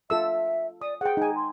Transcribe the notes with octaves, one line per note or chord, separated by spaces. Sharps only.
F4 A4 E5 E6
D5 D#6
G#4 F#5 G5
D#4 G#5
C6